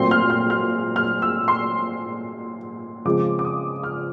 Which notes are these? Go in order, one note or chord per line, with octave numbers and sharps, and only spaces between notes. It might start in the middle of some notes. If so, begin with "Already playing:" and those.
Already playing: A#2 F#3 A3 C4 C6
F6
F6
F6
F6
E6
C6
C#3 F3 G#3 C4 D6
D6
D#6
F6